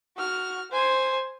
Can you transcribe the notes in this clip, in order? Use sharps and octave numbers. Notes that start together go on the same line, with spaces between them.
F#4 F6
C5 G#5